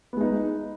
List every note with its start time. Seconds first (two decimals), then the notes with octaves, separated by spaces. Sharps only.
0.13 B3
0.17 G#3
0.21 D#4